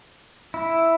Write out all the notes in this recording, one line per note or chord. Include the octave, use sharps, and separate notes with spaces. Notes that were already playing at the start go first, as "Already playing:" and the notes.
E4